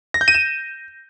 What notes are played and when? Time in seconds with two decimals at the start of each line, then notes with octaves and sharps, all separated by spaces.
0.14 A#6
0.21 G6
0.28 D#7
0.34 E7